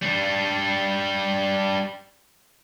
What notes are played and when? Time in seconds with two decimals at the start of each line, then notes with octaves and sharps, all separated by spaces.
0.02 G3 D4